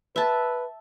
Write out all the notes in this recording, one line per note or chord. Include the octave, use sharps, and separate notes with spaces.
B4 E5 A5